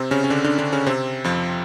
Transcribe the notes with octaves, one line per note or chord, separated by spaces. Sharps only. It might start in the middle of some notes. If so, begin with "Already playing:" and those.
Already playing: C3 C4
C#3 C#4
C#4
D3 D4
D3 D4
D3 D4
C#3 C#4
C3 C4
F2 F3